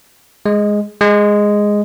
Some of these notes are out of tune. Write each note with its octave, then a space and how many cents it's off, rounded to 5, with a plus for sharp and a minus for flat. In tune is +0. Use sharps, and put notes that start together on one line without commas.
G#3 +0
G#3 -5